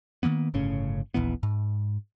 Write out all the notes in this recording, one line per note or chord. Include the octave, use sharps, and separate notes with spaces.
D#3 F#3 A#3 B3
G1 A2 C#3 C#4
D#1 A#1 E3 B3
G#2